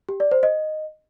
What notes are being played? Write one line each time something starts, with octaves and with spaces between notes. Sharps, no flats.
G4
D5
C5
D#5